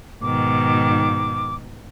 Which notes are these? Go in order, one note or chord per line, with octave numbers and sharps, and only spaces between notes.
G#2 B2 D#3 D6